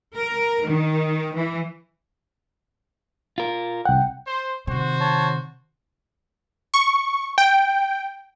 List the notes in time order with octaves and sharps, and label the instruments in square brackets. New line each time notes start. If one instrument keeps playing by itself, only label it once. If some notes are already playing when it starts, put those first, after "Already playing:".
[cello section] A#4
D#3
E3
[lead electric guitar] F4 A#4
[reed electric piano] C2 F#5 [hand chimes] G5
[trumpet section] C5
[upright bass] C3 D#3 [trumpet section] F#4 C5
[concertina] C#5 A5
[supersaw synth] C#6
G5